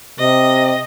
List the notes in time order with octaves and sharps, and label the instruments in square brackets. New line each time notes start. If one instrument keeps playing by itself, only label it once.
[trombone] C3 [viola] D#5